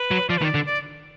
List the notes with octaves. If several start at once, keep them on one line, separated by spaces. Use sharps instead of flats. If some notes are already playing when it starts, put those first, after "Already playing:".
Already playing: B4
F#3
F3 D5
B4
D#3
D5
D3
D5